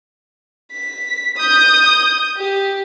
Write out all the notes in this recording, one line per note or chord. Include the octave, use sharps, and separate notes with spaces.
B6
D#6 G6
G4